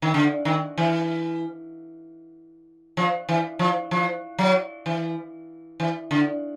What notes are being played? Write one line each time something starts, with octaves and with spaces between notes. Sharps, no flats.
D#3
D3
D#3
E3
F3
E3
F3
F3
F#3
E3
E3
D3